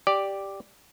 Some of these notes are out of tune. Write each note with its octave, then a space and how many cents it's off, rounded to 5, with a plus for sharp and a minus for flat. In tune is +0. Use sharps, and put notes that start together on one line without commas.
G4 +0 D5 +0